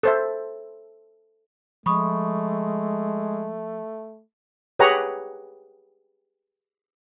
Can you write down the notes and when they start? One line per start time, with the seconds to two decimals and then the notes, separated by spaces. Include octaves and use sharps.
0.03 A4 C5 E5
1.86 F3 G#3 A3 B5 C#6 D#6
4.79 G4 G#4 B4 C#5 F#5 A#5